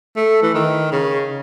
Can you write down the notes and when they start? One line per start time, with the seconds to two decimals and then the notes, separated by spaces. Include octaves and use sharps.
0.16 A3
0.43 E3
0.54 D#3
0.92 C#3